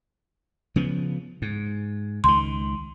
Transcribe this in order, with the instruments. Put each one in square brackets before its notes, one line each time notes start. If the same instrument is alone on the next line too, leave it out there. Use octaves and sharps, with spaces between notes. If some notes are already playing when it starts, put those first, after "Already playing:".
[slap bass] C#3 F3 B3
G#2
[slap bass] C#2 D#3 [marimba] C6